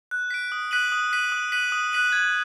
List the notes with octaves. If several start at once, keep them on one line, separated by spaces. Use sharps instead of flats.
F#6
B6 D7
D#6
F#6 B6 D#7 F#7
D#6
F#6 B6 D#7 F#7
D#6
F#6 B6 D#7 F#7
D#6
F#6 B6 D#7 F#7
G#6